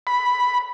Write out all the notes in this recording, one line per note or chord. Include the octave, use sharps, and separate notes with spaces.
B5